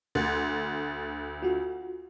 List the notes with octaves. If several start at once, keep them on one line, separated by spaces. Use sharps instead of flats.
D2 F#6 A6
F4 F#4